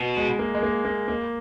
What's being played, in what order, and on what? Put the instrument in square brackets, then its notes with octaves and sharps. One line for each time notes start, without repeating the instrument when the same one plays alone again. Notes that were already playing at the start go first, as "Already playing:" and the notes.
Already playing: [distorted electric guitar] B2
[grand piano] G#3
A#3
G#3
A#3
A#3
A#3